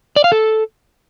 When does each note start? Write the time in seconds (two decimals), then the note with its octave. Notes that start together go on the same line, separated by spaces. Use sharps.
0.16 D5
0.24 F5
0.32 A4